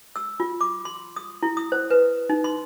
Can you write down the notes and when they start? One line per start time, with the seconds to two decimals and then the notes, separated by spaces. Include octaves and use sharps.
0.16 E6
0.40 F4
0.61 D6
0.85 C6
1.16 D#6
1.42 E4
1.57 D#6
1.72 C5
1.91 B4
2.29 D#4
2.44 C6